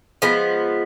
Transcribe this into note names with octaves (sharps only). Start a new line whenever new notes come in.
F3 G#3 B3